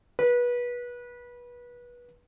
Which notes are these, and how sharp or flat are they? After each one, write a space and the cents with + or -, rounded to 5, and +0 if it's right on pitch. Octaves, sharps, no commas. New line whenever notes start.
B4 -25